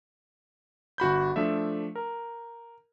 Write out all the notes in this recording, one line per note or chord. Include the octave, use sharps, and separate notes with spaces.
G1 F#4 B5 G6
F3 A3 D4 E5
A#4